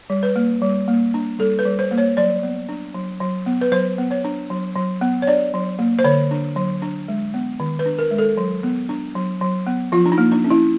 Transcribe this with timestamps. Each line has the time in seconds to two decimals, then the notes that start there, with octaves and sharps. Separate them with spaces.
0.10 G3
0.23 B4
0.36 A#3
0.62 G3
0.88 A#3
1.14 D4
1.39 G3 A4
1.59 B4
1.65 G3
1.79 C5
1.91 A#3
1.98 C#5
2.17 F#3 D5
2.43 B3
2.69 D4
2.94 F#3
3.21 F#3
3.46 B3
3.61 B4
3.72 F#3 C5
3.98 B3
4.11 C#5
4.24 D4
4.50 F#3
4.76 F#3
5.01 B3
5.22 C#5
5.27 D4 D5
5.54 F#3
5.79 A#3
5.99 C5
6.04 D3 C#5
6.31 D4
6.56 F#3
6.82 D4
7.08 G#3
7.34 B3
7.60 D#3
7.79 B4
7.86 D4
7.99 A#4
8.11 G#3
8.18 A4
8.37 F#3
8.63 B3
8.89 D4
9.15 F#3
9.41 F#3
9.67 B3
9.92 F3 F4
10.06 D4
10.12 D#4
10.18 A#3
10.32 D4
10.44 C#4
10.50 E4